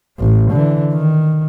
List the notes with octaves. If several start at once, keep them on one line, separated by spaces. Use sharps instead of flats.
A1
D3 E3
D#3